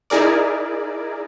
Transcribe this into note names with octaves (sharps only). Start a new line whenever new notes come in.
D#4 E4 G#4 A#4 D5